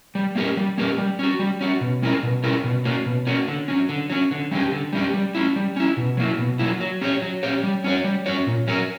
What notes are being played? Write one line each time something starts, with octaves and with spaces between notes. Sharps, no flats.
G3
A#3 C#4 G4 A#4
G3
A#3 C#4 G4 A#4
G3
C#4 F#4
G3
C#4 F#4
B2
G3 C#4 E4 A#4
B2
G3 C#4 E4 A#4
B2
A#3 C#4 F#4
B2
A#3 C#4 F#4
D3
F#3 C#4
D3
F#3 C#4
D3
G3 C#4 G4
D3
G3 C#4 G4
G3
C#4 E4
G3
C#4 E4
B2
F#3 A#3 E4
B2
F#3 A#3 E4
F#3
C#4 G4 C#5
F#3
C#4 G4 C#5
G3
C#4 F#4 C#5
G3
C#4 F#4 C#5
A#2
F#3 C#4 F#4 A#4